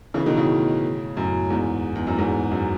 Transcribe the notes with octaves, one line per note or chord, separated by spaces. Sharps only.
C#3 E3
B2 D#3
A2 C#3
F#2 A2
E2 G#2
E2
F#2
E2 G#2
F#2